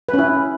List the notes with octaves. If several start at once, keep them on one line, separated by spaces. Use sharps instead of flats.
B4
C#4
E4